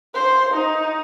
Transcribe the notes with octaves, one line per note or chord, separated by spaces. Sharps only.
C5
D#4